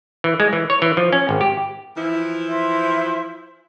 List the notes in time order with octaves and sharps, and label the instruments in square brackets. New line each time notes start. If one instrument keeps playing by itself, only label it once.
[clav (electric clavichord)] E3
G#3
E3
C#5
E3
F3
C#4
G#1
G4
[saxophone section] E3 F3 E4
[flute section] C5 E5